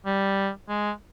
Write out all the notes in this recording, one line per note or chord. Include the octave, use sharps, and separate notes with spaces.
G3
G#3